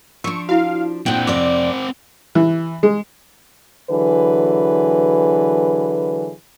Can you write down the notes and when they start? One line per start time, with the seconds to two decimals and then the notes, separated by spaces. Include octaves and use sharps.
0.24 F3 D4 C#6 E6
0.49 E4 F#4 F5
1.06 A#2 C4 D4 F#5 G5
1.27 F2 C3 D5 D6
2.35 E3
2.83 G#3
3.90 D3 E3 F#3 G#4 B4